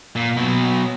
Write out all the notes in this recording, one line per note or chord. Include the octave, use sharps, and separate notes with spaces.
A#2
B2 F#3